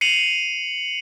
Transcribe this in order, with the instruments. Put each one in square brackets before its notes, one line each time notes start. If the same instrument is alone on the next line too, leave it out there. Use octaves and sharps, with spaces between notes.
[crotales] C7 C#7 D#7 F7 F#7